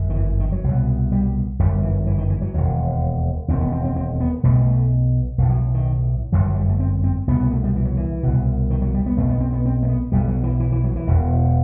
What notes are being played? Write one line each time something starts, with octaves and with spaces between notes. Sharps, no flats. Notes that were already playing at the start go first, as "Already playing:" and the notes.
Already playing: G1 F#2
D#3
E3
D#3
F#3
C2 B2
G3
G1 F#2 G3
E3
E3
D#3
E3
F#3
E1 D#2
E1 D#2 C4
B3
C4
C4
C4
B3
B1 B2 A3
G3
A3
B1 A2
F#3
D#3
G1 F#2 E3
F#3
G3
A3
C4
C4
C2 B2 B3
B3
A3
G3
E3
F#3
E3
C2 B2
D#3
F#3
G3
B3
B1 B2 A3
B3
C4
B3
C4
A3
B3
B1 B2 G3
F#3
E3
E3
E3
F#3
E3
E1 E2 B2